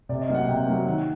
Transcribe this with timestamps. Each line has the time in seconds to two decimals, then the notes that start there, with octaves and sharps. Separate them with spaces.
0.09 C3 D5
0.22 D#5
0.29 F#3 A#3
0.35 F#5
0.48 C3 G5
0.67 F#3 A#3
0.86 D#3 F#5